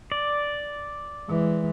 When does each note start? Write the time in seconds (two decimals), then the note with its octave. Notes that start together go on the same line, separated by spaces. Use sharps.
0.12 D5
1.29 E3 G#3